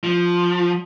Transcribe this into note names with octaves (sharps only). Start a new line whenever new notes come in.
F3